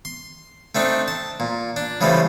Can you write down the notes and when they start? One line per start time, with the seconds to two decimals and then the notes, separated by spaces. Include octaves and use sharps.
0.05 C6
0.75 A3 C4 D4 D#4
1.08 A5
1.40 A#2
1.76 D4
2.01 C#3 E3 F3 G3 A3